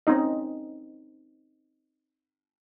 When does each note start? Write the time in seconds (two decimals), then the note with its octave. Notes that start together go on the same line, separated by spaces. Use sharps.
0.07 C4 C#4 D#4 D#5